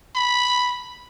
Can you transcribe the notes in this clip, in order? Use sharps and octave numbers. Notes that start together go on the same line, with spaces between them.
B5